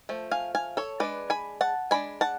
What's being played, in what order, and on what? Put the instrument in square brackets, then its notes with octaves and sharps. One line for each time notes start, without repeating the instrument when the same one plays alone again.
[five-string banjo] F3 A3
F5 G#5
F5 G#5
A4 C#5
G#3 D4 B4 D5
G#5 B5
F#5 A5
G#3 D4 G#5 B5
F#5 A5